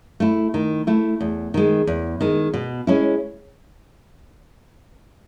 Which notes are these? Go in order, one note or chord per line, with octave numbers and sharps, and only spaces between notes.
A3 E4
D#3
A3 E4
E2
D#3 G#3
E2
D#3 G#3
B2
G#3 C#4 E4